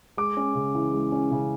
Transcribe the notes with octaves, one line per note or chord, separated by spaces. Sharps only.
G#3 D6
C#4
C#3
E3
G#3
C#4
C#3